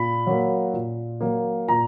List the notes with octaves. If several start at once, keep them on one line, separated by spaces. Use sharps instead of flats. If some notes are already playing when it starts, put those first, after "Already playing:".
Already playing: A#2 B5
F#3 A#3
A#2
F#3 A#3
A#2 A#5